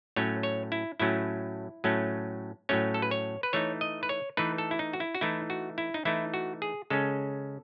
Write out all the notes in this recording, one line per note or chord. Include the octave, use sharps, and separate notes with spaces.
A2 F#3 A3 C#4 C#5
C#5
E4
A2 F#3 A3 C#4 E4
A2 F#3 A3 C#4
A2 F#3 A3 C#4 C#5
A4
B4
C#5
B4
E3 A3 D#4 C#5
D#5
B4
C#5
E3 A3 D#4 B4
A4
E4
D#4
F#4
E4
F#4
E3 A3 D#4 E4
F#4
E4
D#4
E3 A3 D#4 E4
F#4
G#4
C#3 G#3 C#4 A4